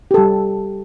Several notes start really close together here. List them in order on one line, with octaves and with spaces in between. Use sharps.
G4 A4 G3